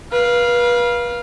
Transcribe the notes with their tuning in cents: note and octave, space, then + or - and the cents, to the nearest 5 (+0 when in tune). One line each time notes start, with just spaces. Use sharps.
B4 -35 F5 +0